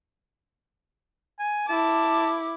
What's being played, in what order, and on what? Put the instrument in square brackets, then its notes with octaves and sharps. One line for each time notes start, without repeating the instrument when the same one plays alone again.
[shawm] G#5
[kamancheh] E4 D6 [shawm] A5